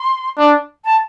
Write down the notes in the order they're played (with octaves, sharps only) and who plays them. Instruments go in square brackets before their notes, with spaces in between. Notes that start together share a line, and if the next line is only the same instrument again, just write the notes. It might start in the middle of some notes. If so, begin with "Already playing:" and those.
Already playing: [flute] C6
[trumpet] D4
[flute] A5